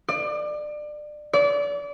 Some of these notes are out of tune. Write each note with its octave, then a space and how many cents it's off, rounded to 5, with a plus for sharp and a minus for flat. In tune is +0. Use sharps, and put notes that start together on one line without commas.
D5 +25
D5 -30